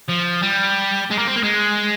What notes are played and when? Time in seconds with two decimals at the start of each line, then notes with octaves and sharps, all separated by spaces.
0.08 F3
0.42 G3
1.10 G#3
1.18 A#3
1.27 C4
1.36 A#3
1.43 G#3